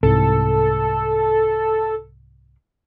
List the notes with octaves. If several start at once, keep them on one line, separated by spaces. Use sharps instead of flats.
C2 G#2 A4